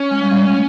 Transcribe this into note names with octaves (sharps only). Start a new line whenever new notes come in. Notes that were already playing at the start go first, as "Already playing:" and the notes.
Already playing: C#4
G#3
G3
G3
G#3
A3